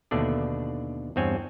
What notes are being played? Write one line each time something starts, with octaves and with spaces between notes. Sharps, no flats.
D#2 B2 D3 A3 D4 D5
E2 G2 C4 C#5 G#5